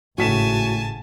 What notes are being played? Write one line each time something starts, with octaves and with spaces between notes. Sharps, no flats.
G#1 A2 C#3 F#4 G#5 A5 B6 E7